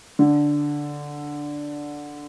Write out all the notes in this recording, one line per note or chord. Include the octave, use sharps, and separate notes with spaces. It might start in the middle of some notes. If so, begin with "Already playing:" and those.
D3